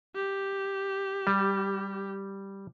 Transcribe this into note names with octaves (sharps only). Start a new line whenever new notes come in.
G4
G3